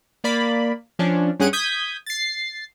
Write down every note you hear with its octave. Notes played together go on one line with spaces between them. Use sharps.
A#3 D5 B5
F3 C#4 D4
G2 C#4 G#4 F#5 D7 D#7
D#6 G6 G#6 B6
A6 C7